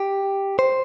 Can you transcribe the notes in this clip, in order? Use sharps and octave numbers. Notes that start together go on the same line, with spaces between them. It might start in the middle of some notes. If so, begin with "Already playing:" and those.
Already playing: G4
C5